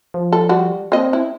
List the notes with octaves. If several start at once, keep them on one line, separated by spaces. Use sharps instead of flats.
F3
A4
G3 F#4
A#3 C4 D#5
E4